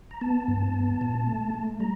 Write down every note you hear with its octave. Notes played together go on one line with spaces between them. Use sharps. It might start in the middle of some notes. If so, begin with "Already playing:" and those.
A#5
B3 A5
G2
B3
A#2
A3
A3
G3 A#5